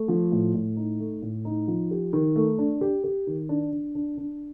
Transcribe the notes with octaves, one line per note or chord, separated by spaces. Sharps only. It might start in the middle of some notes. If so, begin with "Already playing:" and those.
Already playing: A3
F3
A2
A2
D#4
A3
A2
D#4
F3
G4
D#3
A3
D4
G4
G4
D#3
D4
D4
D4
D4